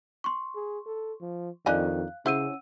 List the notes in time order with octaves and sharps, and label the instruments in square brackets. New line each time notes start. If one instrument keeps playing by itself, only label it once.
[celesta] C6 C#6
[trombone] G#4
A4
F3
[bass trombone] F2 [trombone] D#3 [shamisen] D4 D#4 G#5 [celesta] F5 F#6
[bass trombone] C#3 [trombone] C#4 [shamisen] E4 C5 [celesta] F#5 E6 D#7